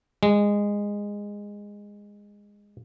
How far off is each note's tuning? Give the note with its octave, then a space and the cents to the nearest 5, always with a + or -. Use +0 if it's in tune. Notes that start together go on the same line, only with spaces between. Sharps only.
G#3 -15